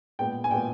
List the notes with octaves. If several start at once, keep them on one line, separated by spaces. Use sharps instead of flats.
A#2 G#3 B3 G5
G#5
A#2 G#3 B3 G5